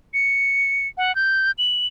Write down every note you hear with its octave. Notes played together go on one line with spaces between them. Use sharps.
C#7
F#5
G6
F#7